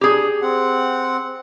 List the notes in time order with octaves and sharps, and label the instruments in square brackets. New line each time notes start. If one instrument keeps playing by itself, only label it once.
[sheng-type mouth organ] D4 [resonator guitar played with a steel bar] G4 G#4
[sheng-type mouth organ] C4 F#5